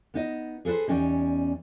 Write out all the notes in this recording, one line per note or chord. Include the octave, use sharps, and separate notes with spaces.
B3 D#4 D#5
G#4 A4 B4 C5
E2 G3 C#4 D#4